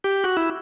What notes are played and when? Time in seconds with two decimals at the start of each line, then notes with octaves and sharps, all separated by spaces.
0.04 G4
0.24 F#4
0.37 E4